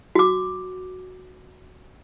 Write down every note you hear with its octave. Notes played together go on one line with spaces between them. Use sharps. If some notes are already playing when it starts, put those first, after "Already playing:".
F#4 D6